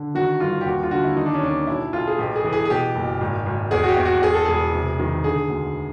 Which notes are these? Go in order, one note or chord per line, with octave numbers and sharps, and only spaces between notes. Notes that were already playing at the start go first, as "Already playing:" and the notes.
Already playing: D3
D#3 F#4
G2 F4
G4
D#2 F#4
F4
D3 F#4
E4
D#3 D#4
D4
C#4
D#2 D4
B1 E4
B1 F4
G#4
A1 G4
G#4
E3
G#4
G#4
B2 G4
F#1
G#1
G#1
E2 G#4
F#4
G4
E2
F#4
E2 G#4
A4
E1 G#4
C3
D#3
D3 G#4
D2